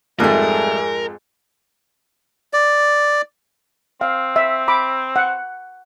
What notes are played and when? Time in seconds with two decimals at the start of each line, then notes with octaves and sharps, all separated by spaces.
0.20 F2 G#2 G3 A3 G#4 A#4
2.53 D5
4.01 C4 F5
4.36 E5
4.68 B5 D6
5.16 F#5